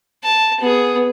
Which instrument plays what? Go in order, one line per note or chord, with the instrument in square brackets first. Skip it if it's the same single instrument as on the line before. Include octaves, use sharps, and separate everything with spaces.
[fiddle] A5
B3 G#4